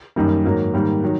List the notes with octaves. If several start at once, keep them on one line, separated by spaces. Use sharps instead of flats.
F#2 D#3 G3 A#3 D#4
G#2 D#3 F#3 A#3
G#2 D#3 G3 A#3
D#3 F#3